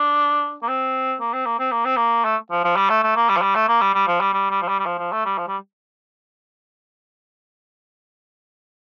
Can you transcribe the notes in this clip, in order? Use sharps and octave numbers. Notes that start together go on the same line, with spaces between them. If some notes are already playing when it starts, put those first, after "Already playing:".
Already playing: D4
A#3
C4
A#3
C4
A#3
C4
A#3
C4
A#3
A3
F3
F3
G3
A3
A3
A#3
G3
F3
G3
A3
A#3
G3
G3
F3
G3
G3
G3
F3
G3
G3
F3
F3
A3
G3
F3
G3